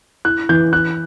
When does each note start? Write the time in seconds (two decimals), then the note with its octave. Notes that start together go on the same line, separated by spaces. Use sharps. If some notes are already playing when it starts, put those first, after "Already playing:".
0.25 E4 F#6
0.49 E3 G6
0.73 E4 F#6